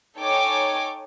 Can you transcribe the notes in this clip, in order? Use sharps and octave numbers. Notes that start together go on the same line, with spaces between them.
D#4 A4 C#5 G5 G#5 D6